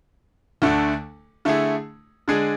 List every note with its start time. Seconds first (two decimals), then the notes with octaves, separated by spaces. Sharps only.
0.62 D2 D3 A3 D4
1.45 D3 A3 E4 G#4
2.28 D3 G#3 D4 G#4